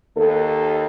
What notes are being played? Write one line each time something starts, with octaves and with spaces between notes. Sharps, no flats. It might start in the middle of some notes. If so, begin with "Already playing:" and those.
D#2 A4